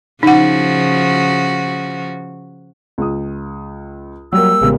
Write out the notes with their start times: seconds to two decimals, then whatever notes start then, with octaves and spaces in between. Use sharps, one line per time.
0.23 C#3 F3 D#4 F#4 F#5
2.98 C#2 D#6
4.33 F#3 G3 A#3 E6
4.62 A1 C#3 G#3 B3 G4 A#4